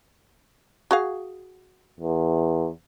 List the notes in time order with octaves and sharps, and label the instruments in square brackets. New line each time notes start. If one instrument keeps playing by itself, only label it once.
[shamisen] F#4 G#4 F5
[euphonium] E2